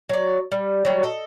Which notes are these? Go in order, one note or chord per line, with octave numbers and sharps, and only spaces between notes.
F#3 D5
G3
F#3 G3
A4 D#5